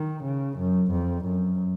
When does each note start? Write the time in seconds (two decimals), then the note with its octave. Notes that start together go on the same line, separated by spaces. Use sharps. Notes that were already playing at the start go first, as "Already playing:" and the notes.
Already playing: D#3
0.23 C#3
0.58 F#2
0.91 F2
1.24 F#2